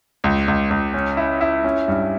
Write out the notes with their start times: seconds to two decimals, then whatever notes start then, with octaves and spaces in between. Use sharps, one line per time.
0.24 C#2
0.48 C#2
0.70 C#2
0.94 C#4
1.17 E4
1.41 E4
1.64 C#4
1.88 G2